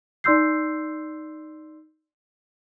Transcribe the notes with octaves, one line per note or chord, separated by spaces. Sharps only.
D#4 D5 C6 E6 G6 C7